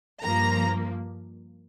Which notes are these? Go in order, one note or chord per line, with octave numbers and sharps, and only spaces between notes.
G2 F3 A#3 A#5